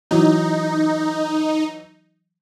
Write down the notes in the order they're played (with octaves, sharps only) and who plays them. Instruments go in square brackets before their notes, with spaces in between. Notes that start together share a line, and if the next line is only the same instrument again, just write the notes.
[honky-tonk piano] E3 F#3 [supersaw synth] D#4